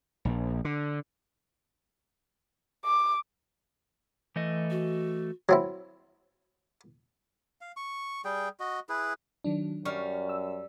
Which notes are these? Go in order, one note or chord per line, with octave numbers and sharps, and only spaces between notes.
A#1
D3
D6
E3 A3 D#5
F#4
F#3 C4 E4
F5
C#6
G3 G#4 G5
F#4 D#5
E4 G#4 B4
D#3 F#3 D4
F#2 G3 C#6 F6
E6